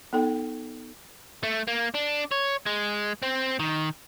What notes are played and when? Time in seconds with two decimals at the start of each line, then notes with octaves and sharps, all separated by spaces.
0.13 B3 D#4 A4 G5
1.43 A3
1.68 A#3
1.94 D4
2.32 C#5
2.66 G#3
3.23 C4
3.59 D#3